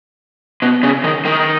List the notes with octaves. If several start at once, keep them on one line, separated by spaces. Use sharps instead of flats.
B2
C#3
D#3
D#3